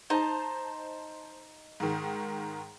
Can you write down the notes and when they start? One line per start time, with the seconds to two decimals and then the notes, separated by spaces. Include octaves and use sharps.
0.10 D#4 C5 A5
1.80 G#2 D#3